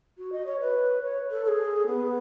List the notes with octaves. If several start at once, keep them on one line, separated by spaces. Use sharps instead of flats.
F#4
D#5
C#5
B4
C#5
A4
A4
G#4
B3